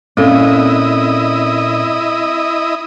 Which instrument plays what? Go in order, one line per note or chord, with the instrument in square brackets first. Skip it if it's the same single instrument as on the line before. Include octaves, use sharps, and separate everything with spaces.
[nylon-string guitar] A#2 C#4 [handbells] C4 A4 [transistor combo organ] E4 D#5